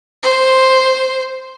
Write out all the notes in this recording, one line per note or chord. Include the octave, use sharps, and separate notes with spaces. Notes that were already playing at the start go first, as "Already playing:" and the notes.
C5